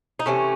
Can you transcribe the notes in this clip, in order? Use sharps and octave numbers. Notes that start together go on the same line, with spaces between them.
D#4
C3 E3 A3 C#4